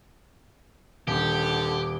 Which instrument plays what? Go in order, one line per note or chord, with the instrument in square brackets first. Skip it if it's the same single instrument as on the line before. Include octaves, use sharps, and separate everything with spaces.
[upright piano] D#1 [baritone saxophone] D3 [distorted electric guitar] G4